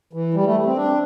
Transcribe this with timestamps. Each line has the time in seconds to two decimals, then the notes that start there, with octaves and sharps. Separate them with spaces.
0.13 E3
0.34 G3
0.45 A3
0.66 C4
0.76 D4